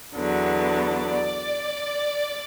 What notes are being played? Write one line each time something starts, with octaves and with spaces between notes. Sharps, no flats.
E2 D3 F#3 B3
D5